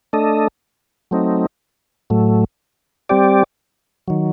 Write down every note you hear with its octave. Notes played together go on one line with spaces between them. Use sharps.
A3 D4 A4 D#5
F#3 A3 C4 D#4
A2 F#3 A3
G3 C4 G4 D5
D#3 F#3